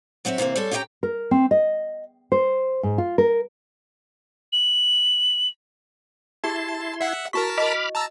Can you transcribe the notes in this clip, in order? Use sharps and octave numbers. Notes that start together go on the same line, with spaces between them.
F#3 C4 F#4 D#5 E5
C3 E3 A#3 C4
G3 G#3 A4 C#5
C#4 G4 C#5 D#5 G5 A#5
A#4
C4
D#5
C5
G#2
F4
A#4
F#7
E4 G4 G#4 A5 C6
E5 F#5
E4 F#4 A#4 A5 C#6 B6
D#5 B5 D6 F6
A5 A#5 E6